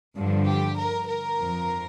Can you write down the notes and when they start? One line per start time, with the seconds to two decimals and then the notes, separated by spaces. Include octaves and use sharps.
0.16 G2 D3 F3
0.47 G4
0.77 A#4
1.08 A#4
1.39 F2 F3